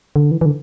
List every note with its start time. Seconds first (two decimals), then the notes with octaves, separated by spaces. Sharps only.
0.16 D3
0.31 E3
0.41 E3
0.46 D3